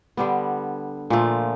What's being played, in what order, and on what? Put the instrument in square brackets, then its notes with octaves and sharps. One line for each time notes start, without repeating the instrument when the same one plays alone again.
[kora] D3 G3 B3
A#2 F3 A3